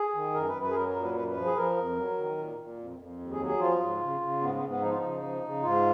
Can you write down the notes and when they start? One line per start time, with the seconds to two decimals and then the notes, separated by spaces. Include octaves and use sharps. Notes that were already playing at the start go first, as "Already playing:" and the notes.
Already playing: G#4
0.15 D#3
0.34 F#2 A#4
0.48 B4
0.55 F#2
0.62 B4
0.71 G#4
0.75 F#3 A#4
0.89 A#4
0.95 A#2
1.03 B4
1.16 F#2 B4
1.31 B4
1.36 F3
1.45 G#4
1.56 F3 A#4
1.77 F2
1.97 F#3
2.18 D#3
2.38 A#2
2.59 A#2
2.78 F2
2.99 F2
3.20 D#2
3.33 G#4
3.40 F#3
3.46 G#4
3.60 F3 F4
3.80 G#2
4.01 C#3
4.21 C#3
4.41 G#2 B3
4.55 B3
4.62 G#2
4.69 B3
4.82 F3 D#4
4.90 F4
4.98 D#4
5.03 C#3
5.23 F3
5.43 C#3
5.63 G#2 F4